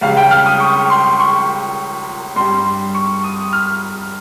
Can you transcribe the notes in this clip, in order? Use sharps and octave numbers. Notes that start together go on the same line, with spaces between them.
C#2 C#3 G3 F5
G5
F6
D#6
C#6
C6
C#6
G2 G3 C6
C#6
D#6
F6